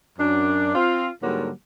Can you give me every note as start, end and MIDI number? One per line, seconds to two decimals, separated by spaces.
0.19 0.74 42
0.19 0.74 62
0.75 1.08 60
0.75 1.08 65
1.23 1.50 44
1.23 1.50 50
1.23 1.50 54
1.23 1.50 55
1.23 1.50 58